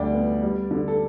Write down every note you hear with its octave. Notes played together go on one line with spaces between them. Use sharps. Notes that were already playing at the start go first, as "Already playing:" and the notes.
Already playing: D2 G3 D5 G5
B3
G3
D3
A4